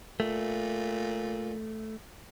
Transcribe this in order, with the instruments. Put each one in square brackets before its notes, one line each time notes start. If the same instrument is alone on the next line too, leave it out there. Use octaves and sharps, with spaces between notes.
[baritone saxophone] A#2 [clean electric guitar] A3